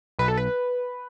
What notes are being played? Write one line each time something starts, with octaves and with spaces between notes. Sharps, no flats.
B1 B4
A4
B4